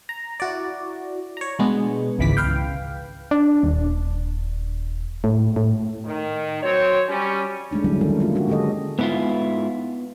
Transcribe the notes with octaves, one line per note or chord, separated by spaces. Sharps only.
A#5
E4 F#4 D5
C#5 A#5
B2 G#3 B3 D4
G#1 C#2 E3 B5 D6 B6
B4 F5 G5
D4
D#1
A2
A2
D#3
F#3 C4 C#5
G3 C#4
G#3 A3 D4 D#4
D3 F#3 G3 A3 C#4 E4
D#3 G#3 C#4 E4 A4 A#4
A#3 F4
D4 F#4 G4
D3 G#3 C#4 G#4 A4 D#5
G#2 B3 E4 F4